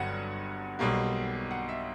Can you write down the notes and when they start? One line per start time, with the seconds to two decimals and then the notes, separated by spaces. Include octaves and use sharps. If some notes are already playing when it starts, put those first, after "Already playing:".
Already playing: G1 G2 F#3 B3 F#5
0.79 B1 B2 G3 A#3
1.51 F#5
1.69 E5